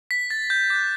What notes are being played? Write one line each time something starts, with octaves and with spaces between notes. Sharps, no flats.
B6
A6
G6
D6 F#6 G6